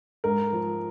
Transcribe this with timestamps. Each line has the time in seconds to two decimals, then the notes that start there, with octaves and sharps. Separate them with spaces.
0.24 G#2 A#4
0.53 F3